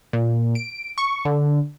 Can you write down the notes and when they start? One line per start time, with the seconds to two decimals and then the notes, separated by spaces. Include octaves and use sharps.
0.13 A#2
0.55 D7
0.98 C#6
1.25 D3